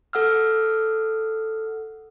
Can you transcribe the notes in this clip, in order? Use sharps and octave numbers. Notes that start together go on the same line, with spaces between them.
A4 F#5 E6 F6